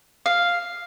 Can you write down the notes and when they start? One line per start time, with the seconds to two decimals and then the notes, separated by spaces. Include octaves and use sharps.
0.26 F5